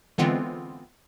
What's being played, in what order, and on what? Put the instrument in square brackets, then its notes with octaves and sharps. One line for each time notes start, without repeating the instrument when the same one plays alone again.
[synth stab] D3 E3 G#3 B3 C4 F4